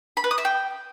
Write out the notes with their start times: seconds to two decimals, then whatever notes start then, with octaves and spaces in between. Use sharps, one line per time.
0.17 B5
0.24 B4
0.31 D#6
0.38 E5
0.45 G5